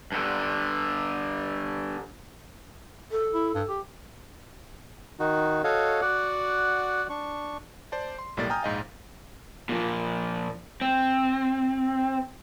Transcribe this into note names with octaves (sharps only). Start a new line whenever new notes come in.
G2 D3
A4
E4
G2
G4
D#3 D#4 F#4
F#4 A4 C#5 D#5 F5
F#4 D5 F#5
D4 C#6
C5 D5 A5
C6
B1 A2 G3 A#3 D5 A6
G5 G#5 A#5 D#6 F6 G6
A#1 G#2 D#5 F5
A#2 F3
C4